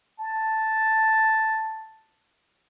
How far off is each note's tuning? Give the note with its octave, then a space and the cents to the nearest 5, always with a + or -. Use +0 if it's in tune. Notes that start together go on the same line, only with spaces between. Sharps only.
A5 +0